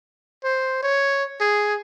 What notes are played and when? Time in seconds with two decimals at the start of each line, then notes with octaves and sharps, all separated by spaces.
0.44 C5
0.83 C#5
1.41 G#4